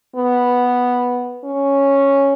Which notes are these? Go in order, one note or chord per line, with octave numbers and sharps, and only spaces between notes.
B3
C#4